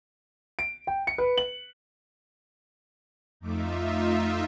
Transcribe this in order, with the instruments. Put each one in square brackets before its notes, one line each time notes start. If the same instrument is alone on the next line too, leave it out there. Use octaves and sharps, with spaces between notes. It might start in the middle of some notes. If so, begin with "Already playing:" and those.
[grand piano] D7
G5
C#7
B4
F#7
[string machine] F2 A3 D6 [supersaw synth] D#4 F4 E5